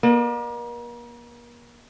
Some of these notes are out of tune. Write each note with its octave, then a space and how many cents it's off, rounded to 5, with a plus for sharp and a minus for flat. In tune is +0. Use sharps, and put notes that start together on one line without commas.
A#3 +40 D#5 -45